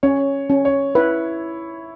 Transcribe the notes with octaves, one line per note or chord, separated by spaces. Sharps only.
C#4 C#5
C#4
C#5
E4 B4